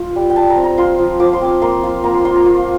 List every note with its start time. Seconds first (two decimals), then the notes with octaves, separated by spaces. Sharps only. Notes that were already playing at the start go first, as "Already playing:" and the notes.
Already playing: F4
0.16 G3
0.30 G5
0.36 G3 A5
0.50 A#5
0.57 C4
0.64 A#5
0.78 F4 C6
0.99 F3
1.20 F3 D6
1.33 C6
1.41 C4 D6
1.62 A#3 C6
1.83 F4
2.04 A#3 A#5
2.14 C6
2.25 F4 C6
2.36 A#5
2.46 F4